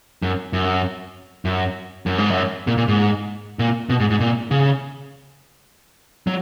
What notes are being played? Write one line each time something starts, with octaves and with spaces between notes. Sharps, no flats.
F#2
F#2
F#2
F#2
G#2
F#2
A#2
A#2
G#2
A#2
B2
G#2
G#2
A#2
C#3
F#3